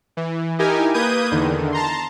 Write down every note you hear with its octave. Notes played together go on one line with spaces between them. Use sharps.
E3
D#4 E4 G4 A#4 G#5
A#3 B4 D#6 G6 G#6 D#7
E2 D3 D#3
A5 A#5 C6